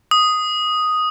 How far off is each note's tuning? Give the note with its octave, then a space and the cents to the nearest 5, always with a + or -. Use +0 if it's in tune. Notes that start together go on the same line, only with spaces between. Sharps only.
D#6 +0